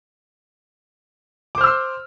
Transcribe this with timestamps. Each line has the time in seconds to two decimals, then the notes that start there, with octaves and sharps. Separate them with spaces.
1.55 D6
1.58 C5
1.61 F6
1.64 E6
1.67 C6